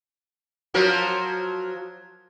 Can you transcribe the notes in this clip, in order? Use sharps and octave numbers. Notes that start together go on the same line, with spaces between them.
F3 F#3 A#4